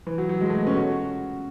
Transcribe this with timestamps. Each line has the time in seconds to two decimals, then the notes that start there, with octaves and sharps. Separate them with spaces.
0.07 E3
0.18 F#3
0.29 F#3
0.41 G#3
0.50 A3
0.59 B3
0.67 C#4
0.75 F#4